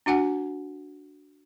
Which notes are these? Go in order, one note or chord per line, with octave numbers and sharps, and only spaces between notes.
D4 F#4 F#5 G#5